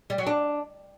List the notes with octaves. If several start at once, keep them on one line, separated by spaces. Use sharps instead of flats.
G3
F#3
D4